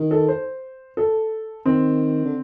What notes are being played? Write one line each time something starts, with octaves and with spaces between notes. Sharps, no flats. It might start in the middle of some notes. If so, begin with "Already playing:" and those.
Already playing: D#3
A4
C5
A4
D#3 C4
D3